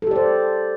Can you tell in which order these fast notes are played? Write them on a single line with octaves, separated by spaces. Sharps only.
A4 G4 D5 C5